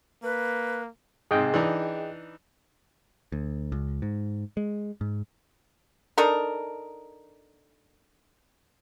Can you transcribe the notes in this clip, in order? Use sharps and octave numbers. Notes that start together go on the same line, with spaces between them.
A#3 B4
G#2 C3 G#4 D#5 G5
E3 D4 D#4
D2
C#2
G#2
G#3
G#2
D4 D#4 A4 A#4